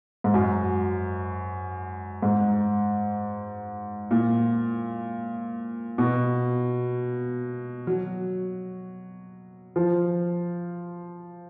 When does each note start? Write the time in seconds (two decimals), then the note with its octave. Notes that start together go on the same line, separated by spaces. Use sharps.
0.24 G#2
0.34 F#2
2.22 G#2
4.11 A#2
5.98 B2
7.87 F#3
9.76 F3